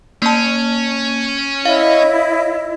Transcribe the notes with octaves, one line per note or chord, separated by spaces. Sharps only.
A#3 C#4 A5
E4 C#5 D#5 F5